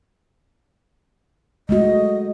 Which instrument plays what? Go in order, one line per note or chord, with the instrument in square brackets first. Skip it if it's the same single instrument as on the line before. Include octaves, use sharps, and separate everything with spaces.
[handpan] G#3 A3 F#4 [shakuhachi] D#5